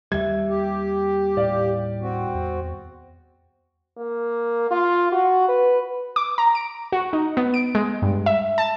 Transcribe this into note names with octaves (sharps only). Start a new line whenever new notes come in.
D#2 G3 E5 G#6
G4
A2 D5 F5
C4 F#4
E2
A#3
F4
F#4
B4
D6
A#5
D7
F#4
D#4
B3
D7
G#3
G2
E5
A5